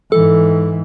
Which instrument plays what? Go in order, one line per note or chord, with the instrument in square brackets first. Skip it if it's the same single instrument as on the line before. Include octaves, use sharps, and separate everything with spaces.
[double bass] G#2 E3 [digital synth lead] A4